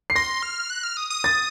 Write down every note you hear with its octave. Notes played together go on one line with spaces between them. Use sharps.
C7
C6 A#6
F6
F#6
F6
D#6
D#6
A6